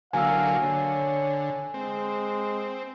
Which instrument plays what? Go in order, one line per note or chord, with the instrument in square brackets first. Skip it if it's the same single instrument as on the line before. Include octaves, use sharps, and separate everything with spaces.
[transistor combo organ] D3 F#3 A#3 [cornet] F5 [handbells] G#5 E6
[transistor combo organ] D3 [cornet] C#5
[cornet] G#3 [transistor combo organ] C4